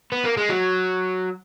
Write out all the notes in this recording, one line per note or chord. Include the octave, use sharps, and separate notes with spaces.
B3
A#3
G#3
F#3